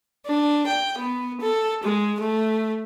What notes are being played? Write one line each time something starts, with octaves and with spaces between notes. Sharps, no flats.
D4
G5
B3
A4
G#3
A3